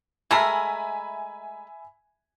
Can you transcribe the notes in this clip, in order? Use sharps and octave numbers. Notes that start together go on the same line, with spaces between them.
G#3 A3 A#4 E5 G#5 B5